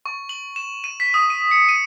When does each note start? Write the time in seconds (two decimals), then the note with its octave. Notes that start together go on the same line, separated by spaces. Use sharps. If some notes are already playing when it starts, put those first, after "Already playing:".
0.06 C#6
0.29 F#7
0.56 E7
0.84 D#7
1.00 B6
1.14 D#6
1.30 D#7
1.51 C#7
1.69 D#7